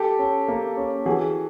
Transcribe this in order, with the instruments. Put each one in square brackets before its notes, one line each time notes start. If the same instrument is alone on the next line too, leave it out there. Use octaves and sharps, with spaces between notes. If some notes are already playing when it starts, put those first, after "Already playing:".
Already playing: [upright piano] G4 A4
[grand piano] C#4
A#3
C#4
[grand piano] E3 [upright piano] F#4 G#4